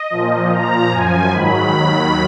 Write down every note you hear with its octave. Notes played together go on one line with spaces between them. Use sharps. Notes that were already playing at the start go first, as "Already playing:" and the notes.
Already playing: D#5
A#2 F3
A#2 F3 A#5
F#2 F3 G#5
G#2 D#3 F#3 B5
D#2 D#3 F#3 B5